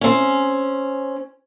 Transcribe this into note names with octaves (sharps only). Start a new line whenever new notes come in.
C4 C#4